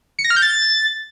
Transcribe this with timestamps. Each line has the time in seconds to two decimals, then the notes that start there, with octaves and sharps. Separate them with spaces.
0.19 C#7
0.24 A#6
0.30 F6
0.36 G6
0.42 A6